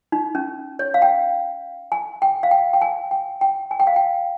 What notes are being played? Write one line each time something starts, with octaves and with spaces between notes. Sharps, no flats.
D#4
C#4
C#5
F5
G5
G#5
G5
F5
G5
G5
G#5
G5
G5
G#5
G5
F5
G5